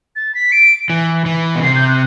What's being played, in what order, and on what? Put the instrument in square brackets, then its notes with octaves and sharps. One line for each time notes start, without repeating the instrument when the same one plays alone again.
[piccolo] A6
B6
D7
[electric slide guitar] E3
E3
B2
[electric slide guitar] C3 [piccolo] C7
[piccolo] G6
F#6